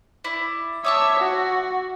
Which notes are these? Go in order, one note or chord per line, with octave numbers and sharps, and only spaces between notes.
E4 D5
C#5 E5 A5 D6 D#6
F#4